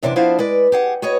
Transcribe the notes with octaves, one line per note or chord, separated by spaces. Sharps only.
F#2 C3 E3 D4 C5 D5
F3 B3 D4 E4 C5 F5
G#3 B4 D5
G4 G#4 F#5
F#4 G#4 B4 C#5 D#5